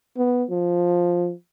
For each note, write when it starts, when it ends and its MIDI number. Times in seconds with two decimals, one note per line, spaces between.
0.17 0.44 59
0.50 1.32 53